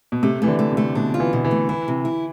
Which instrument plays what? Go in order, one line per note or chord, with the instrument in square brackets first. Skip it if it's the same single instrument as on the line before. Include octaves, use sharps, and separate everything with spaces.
[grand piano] B2
[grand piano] C3 [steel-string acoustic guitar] A3
[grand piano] E3 [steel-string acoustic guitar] A3
[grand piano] D3
[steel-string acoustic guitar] A3
[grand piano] C3
[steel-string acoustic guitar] A3
[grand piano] B2 [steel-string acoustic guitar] D4
[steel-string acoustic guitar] F4
[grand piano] E3
[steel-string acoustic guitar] B2
[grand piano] E3
[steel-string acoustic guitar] A3
[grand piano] E3 [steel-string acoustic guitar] E4
[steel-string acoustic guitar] C3
E4